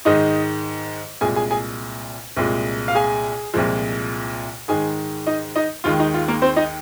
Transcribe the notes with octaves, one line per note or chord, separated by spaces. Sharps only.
G#2 D#3 G#3 D#4 D#5
C2 A#2 G#3 G#4 G#5
G#4 G#5
G#4 G#5
C2 A#2 G#3
F5
G#4 G#5
C2 A#2 F3 G#3
G#2 D#3 G#3 G#4 G#5
D#4 D#5
D#4 D#5
D#2 D#3 G#3 F4
D#4
F4
A#3 A#4
C4 C5
D#4 D#5